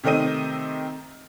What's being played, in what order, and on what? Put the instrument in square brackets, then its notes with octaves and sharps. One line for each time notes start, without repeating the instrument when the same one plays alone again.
[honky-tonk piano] C3 D#3 A3 C4 D#5 D#7